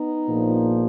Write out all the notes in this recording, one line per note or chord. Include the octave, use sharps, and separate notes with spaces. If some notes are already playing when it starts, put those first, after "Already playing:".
Already playing: B3 D#4
A#1 A#2 F3